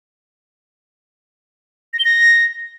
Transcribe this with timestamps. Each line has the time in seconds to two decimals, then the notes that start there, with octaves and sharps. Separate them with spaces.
1.93 A#6
1.99 G7
2.05 A#6